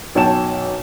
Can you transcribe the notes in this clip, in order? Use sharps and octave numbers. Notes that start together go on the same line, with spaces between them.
B1 F#2 C#5 G5 A5 E7